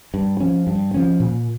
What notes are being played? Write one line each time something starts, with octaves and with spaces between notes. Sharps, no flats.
G2
F3 C#4
G2
F3 C#4
A#2